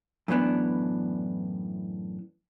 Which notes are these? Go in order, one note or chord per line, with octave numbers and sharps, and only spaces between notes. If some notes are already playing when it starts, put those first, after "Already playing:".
F#2 A2 E3 B3 D4